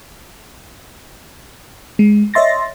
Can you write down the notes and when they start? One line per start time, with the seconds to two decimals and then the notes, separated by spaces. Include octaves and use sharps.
1.99 G#3
2.34 C#5 D#5 E5 C6 A6 A#6